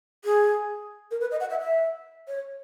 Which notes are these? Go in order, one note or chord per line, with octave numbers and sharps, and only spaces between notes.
G#4
A#4
B4
D#5
F#5
E5
E5
C#5